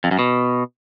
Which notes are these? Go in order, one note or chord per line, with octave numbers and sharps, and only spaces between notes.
F2
F#2
B2